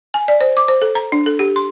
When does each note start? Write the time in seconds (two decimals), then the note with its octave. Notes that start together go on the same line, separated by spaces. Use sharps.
0.14 G#5
0.28 D5
0.41 C5
0.57 D6
0.68 C5
0.82 A4
0.95 A#5
1.12 D4
1.26 A4
1.39 G4
1.56 C6